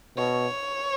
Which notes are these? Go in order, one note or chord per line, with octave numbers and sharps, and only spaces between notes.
B2 C#5